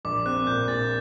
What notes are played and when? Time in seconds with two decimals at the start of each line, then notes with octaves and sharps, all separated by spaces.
0.05 A#1 D6
0.26 C4 F#6
0.47 A#2 G6
0.68 A#2 A6